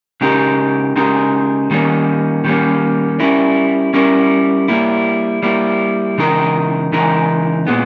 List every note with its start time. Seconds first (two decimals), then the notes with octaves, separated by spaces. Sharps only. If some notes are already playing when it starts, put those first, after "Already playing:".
0.21 C#3 G#3 D#4 G4 A#4
0.96 C#3 G#3 D#4 G4 A#4
1.71 D#3 G3 A#3 C#4
2.44 D#3 G3 A#3 C#4
3.20 G3 C#4 E4 A#4
3.94 G3 C#4 E4 A#4
4.68 G3 A#3 E4
5.43 G3 A#3 E4
6.18 C#3 E3 G#3 D#4 A#4
6.92 C#3 E3 G#3 D#4 A#4
7.67 A#2 G#3 B3